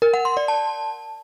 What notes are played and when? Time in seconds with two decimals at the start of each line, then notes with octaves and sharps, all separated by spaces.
0.02 A#4
0.14 F#5
0.25 C6
0.37 D5
0.48 A5